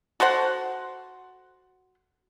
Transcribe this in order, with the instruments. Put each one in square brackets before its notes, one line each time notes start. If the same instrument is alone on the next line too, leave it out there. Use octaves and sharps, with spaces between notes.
[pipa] F#4 A4 C5 F#5